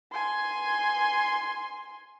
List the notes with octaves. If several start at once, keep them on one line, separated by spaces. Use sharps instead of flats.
G#5 C6